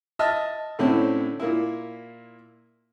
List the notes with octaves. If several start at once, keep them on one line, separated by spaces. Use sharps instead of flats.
D#5 E5 A5 E6 F6
A2 D3 C4 C#4 E4
A#2 A#3 E4